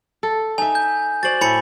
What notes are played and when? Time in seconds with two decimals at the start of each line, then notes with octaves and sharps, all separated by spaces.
0.23 A4
0.58 D#4 E5 G#5
0.75 G6
1.23 F#4 C5 D5 A6 F#7
1.41 A2 E5 G#5 B5 C#7